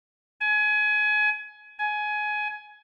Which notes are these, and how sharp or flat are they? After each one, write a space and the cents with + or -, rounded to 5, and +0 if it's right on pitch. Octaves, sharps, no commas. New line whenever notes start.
G#5 +25
G#5 +20